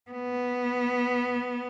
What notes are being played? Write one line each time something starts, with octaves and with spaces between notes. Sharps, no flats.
B3